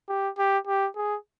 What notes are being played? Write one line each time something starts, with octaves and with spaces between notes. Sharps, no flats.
G4
G4
G4
G#4